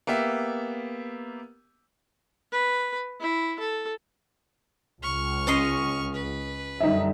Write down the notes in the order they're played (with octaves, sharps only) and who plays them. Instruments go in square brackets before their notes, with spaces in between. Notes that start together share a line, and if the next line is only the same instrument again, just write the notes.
[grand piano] A#3 B3 G4 E5
[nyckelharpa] B4
E4
A4
[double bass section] C#2 C#3 [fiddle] C#6 F6
[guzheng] C#4 D#5 C6
[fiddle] B4
[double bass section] F#2 D3 G3 [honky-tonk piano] D#4 E5